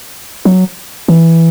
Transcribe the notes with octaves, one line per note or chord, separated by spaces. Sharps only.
F#3
E3